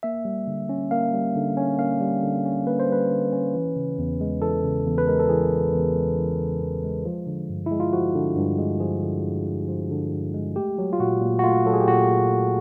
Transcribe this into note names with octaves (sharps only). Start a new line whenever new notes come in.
A#3 E5
G3
D3
C#4
A#3 F5
G3
D3
C#4
A#3 F5
G3
D3
C#4
A#3 B4
C5
G3 B4
D3
C#4
E3
C#3
E2
G#3
E3 A4
C#3
E2
B4
G#3 A#4
A4
E3 G#4
C#3
E2
G#3
E3
C#3
E2
G#3
F3
D3
G2
G#3 E4
F4
F3 F#4
D3
G2
G#3
F3 G#4
D3
G2
G#3
F3
D3
G2
G#3
A3 G4
F#3
F4
A#2 F#4
A#2
F#4
A3 F4
F#3 A4
G#4
G4
A#2 F#4
A#2
A3